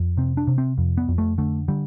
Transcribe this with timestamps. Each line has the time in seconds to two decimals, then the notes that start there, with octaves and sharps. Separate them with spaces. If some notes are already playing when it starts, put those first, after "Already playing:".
Already playing: F2
0.17 C3 C4
0.37 D4
0.47 C3
0.58 C4
0.78 F2
0.97 B3
1.08 F2
1.18 A3
1.38 D3 A3
1.68 D3 G3